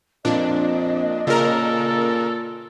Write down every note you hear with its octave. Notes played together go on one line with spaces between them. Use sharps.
F2 A#2 D4 D#5
A#2 C#3 A4 A#4